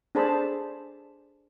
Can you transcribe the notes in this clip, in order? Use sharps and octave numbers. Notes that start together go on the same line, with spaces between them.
D4 G#4 A4 C5 A5 B5